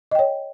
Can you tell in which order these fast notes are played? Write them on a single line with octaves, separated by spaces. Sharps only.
D#5 G5 C#5